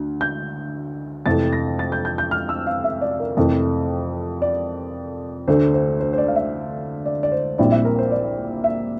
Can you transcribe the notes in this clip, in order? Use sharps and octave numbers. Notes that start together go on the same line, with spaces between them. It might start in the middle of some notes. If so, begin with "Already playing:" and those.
Already playing: D2
G6
F2 C3 E3 A3 A6
A#6
A6
G6
G6
G6
F6
E6
F5
E5
D5
A#4
F2 C3 E3 A3
D5
D2 D3 A3 D4 C5
C5
C5
C5
D5
F5
E5
D5
D5
C5
A#1 A#2 G3 C4 E4 D5
E5
A#4
C5
D5
E5